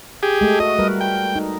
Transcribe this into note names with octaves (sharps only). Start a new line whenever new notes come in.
G4 G#4
G#3 A3 A4
F#4 D#5
G3 A#4 B4
G5
D#4